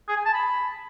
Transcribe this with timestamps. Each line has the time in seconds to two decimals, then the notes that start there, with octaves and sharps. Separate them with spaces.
0.08 G#4
0.17 G#5
0.25 A5
0.34 B5